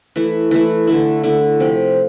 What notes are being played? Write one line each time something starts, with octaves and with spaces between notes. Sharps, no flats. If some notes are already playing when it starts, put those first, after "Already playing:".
E3 A3 E4
E3 A3 E4
D3 A3 E4
D3 A3 E4
C3 F3 C4